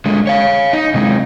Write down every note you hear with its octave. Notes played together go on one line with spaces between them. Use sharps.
D3 G#3
C#5 F5
D#4
C3 G#3